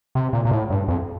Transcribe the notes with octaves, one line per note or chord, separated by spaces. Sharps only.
C3
A#2
A#2
A2
G2
F2